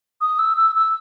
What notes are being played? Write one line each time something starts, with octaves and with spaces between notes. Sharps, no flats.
D#6
E6
E6
E6